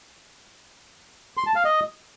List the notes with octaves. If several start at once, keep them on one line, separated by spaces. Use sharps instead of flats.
C6
A5
F5
D#5